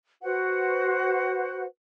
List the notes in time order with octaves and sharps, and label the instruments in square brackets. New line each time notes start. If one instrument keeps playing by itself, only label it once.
[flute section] F#4 B4 C5 F#5